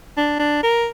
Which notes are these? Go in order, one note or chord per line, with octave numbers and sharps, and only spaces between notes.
D4
D4
A#4